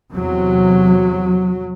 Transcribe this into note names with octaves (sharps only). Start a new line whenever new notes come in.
E2 C3 F#3